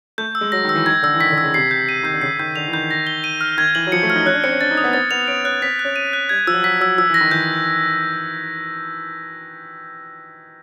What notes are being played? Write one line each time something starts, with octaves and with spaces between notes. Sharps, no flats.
A3 G6
E6
G#3
F#3 A#6
D#3
E6
E3
D#3 G#6
D3 E6
E3
D#3 B6
D3
E6
C#3
C3 C7
G6
D#7
D#3 G6
D3
C#3 C7
D#3 G6
D3 F7
E3
D#3 G6
A#6
G7
D#7
F6
D#3 G#6
E3 F#7
F#3
F3 C#7
A3
F6
D#4
C#4 F#6
D4
C4 C#7
C#4
D4 A6
D#4
D#6
B3
C4 A6
B3 F7
C#4 D7
C#4 F#6
C4 B6
F#6
C#4
D#7
F#6
G3 G#6
F3 E6
F#3
F#3 B6
F#3 E6
F3 E6
E3
A#6
D#3
E3 G6